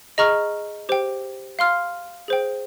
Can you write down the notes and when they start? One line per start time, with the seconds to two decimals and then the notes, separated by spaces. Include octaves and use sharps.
0.18 G#4 D#5 A#5 C#6 F6
0.89 G4 C5 G5
1.59 F5 C6 F6
2.28 G#4 C5 G5